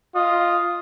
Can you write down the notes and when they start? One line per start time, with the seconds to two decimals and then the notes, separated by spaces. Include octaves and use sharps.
0.15 F4 D#5